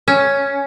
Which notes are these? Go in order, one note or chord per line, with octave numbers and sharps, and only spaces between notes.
C#4